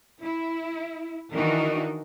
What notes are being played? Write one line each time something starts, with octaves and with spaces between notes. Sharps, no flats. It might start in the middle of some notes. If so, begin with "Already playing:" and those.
E4
D#3 E3 D4 D#4 F#4 A#4